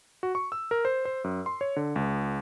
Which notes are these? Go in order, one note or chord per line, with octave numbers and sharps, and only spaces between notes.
F#4
C#6
E6
A#4
C5
C5
F#2
C6
C#5
D3
C#2